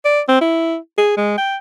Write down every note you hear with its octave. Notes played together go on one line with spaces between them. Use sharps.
D5
C4
E4
G#4
G#3
G5